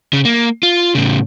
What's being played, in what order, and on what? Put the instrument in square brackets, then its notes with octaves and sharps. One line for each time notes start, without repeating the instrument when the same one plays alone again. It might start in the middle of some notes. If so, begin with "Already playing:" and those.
[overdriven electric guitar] C#3
A#3
F4
A2 C#3